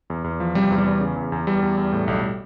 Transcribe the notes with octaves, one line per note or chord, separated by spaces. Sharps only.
E2
E2
F3
C3 G3
E2
G3
E2
C#3
E2
E2
E2 G3
E2
E2
A2
B1